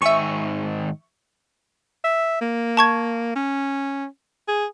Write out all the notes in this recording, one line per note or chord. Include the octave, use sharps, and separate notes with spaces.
G#2 D#3 E5 G#5 C#6
E5
A#3
A5 C#6 G#6
C#4
G#4